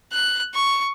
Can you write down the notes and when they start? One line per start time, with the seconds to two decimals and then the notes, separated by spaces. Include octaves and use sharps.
0.12 F#6
0.55 C#6